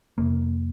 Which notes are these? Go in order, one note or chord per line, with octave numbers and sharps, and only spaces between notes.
F2 C3 A#3